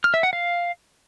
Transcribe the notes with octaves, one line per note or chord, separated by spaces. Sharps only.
F6
E5
F#5
F5